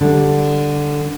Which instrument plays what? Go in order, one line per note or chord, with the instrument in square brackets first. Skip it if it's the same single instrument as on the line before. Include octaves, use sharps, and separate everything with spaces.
[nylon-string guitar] D3 G3